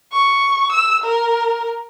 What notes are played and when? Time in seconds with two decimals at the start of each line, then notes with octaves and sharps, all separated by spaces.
0.13 C#6
0.72 E6
1.04 A#4